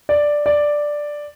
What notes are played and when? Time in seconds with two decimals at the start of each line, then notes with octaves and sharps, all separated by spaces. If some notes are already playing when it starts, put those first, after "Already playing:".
0.09 D5
0.46 D5